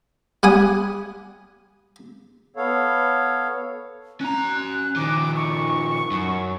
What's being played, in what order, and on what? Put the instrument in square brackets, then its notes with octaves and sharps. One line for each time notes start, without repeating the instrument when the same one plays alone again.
[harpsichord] G3 F#5 G#5 D#6
[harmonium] B3 A4 C#5 F5
[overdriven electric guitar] C#4 A#5 [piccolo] F#6
[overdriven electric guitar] D#3 F3 [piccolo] D6
[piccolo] C#6
[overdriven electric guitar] F#2